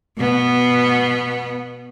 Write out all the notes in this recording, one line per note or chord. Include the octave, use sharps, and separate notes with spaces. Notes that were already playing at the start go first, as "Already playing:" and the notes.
B2 B3